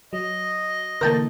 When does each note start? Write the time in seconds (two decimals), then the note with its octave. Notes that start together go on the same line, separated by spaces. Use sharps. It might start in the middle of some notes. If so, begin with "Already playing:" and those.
0.13 F#3 D#5
1.01 D3 E3 A#3 A#4 G5 A5